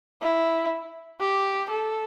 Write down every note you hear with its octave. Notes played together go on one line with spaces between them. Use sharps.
E4
G4
A4